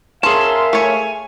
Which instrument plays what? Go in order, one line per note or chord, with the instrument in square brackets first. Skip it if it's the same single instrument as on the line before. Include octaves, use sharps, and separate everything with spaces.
[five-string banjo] C#4 [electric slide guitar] G#4 A5 [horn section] A#4 E5 F5 [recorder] C6
[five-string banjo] A3 C#5 [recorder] G#5